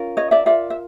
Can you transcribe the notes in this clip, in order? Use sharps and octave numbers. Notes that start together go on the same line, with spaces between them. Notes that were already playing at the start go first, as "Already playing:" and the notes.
Already playing: C#4 F4 A#4
C#5 D#5
D5 E5
F4 A#4 D5 E5
E5